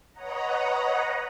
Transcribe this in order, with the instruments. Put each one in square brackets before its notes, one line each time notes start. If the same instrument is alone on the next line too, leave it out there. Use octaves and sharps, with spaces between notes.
[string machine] B4 C#5 D#5 F#5 A#5